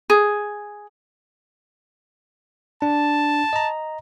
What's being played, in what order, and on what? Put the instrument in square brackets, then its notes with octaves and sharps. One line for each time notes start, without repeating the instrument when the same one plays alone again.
[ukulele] G#4
[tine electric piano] D4 [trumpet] A5
[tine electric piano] D#5 A#5